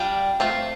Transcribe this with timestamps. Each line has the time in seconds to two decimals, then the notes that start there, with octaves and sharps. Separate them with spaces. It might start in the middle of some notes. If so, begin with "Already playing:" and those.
Already playing: G3 D4 F4 G5
0.40 A3 C4 F4